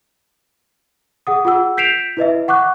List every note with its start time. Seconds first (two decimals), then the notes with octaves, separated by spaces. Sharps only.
1.27 G#4 F#5 D#6
1.45 F4 G#4 F#5 E6
1.77 G6 B6 C7 D7 E7 F7
2.17 E4 B4 D#5 E5
2.48 F#5 C#6 D6 F#6